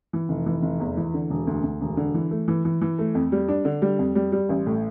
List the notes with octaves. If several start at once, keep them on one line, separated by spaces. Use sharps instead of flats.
E3
F1
E3
F1
E2
E3
D3
E1
D2
D2
E1
D3
E3
A3
E3
E3
E3
A3
F2
G3
D4
D3
G3
F2
G3
G3
A1
A2